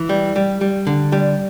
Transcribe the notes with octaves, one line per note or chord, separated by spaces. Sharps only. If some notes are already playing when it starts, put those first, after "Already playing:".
Already playing: E3
G3
G3
G3
D3
G3